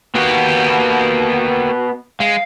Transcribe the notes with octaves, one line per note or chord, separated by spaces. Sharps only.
A#3 B3 F#4 G4
G#3 F5